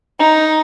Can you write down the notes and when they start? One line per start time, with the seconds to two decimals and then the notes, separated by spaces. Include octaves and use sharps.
0.19 D#4